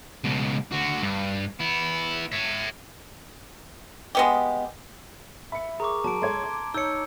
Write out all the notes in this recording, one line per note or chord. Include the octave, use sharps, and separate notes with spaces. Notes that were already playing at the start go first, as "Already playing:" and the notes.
C#2 B2
D3 F#4
G2
B3 E4
C#5 E5
G#3 B3 G4
E5 B5 C#7
G#4 A#4 A#5 C#6 D6
F#3 A5 D7
G#3 A4 C#5 C6 G#6
D6
D#4 C#5 E6 G6 C#7